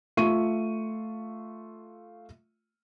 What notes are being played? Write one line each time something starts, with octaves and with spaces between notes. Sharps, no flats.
A3 F4 E5 C#6 D#7